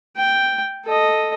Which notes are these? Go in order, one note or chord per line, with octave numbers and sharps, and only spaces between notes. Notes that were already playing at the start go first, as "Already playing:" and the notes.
G5
A4 D#5